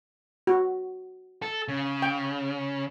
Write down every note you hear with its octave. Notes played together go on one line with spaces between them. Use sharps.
F#4
A4
C#3
G5